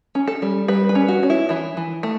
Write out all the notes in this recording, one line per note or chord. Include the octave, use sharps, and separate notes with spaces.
C#4
A4
G3
G3 B4
B4
C#4
F#4
C#4
E4
E3 E4
E3
A3